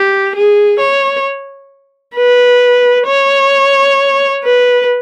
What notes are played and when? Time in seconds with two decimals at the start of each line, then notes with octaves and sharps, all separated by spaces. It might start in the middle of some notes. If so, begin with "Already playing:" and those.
Already playing: G4
0.35 G#4
0.80 C#5
2.16 B4
3.07 C#5
4.44 B4